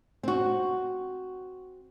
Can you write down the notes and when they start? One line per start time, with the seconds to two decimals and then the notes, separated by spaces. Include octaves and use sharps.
0.23 C4 F#4